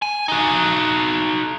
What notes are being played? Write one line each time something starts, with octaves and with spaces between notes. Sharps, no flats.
G#5
D#4 F#4